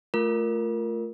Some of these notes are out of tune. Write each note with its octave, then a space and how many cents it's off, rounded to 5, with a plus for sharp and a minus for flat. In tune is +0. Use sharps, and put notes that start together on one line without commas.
A3 +0 F4 +0 A#4 +0